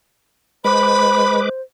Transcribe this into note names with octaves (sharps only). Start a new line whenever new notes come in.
G#3 B4 C5 B5 D6